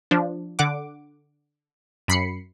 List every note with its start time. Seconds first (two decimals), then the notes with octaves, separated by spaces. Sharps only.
0.11 F3 D4
0.59 D3 F#5 D6
2.08 F#2 B5 C7 C#7